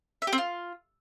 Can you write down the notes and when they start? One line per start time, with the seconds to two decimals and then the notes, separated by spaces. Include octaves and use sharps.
0.22 E5
0.27 G4
0.33 C4
0.38 F4